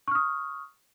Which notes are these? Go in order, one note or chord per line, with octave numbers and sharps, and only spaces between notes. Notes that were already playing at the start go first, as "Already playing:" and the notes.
C#6 D#6 F6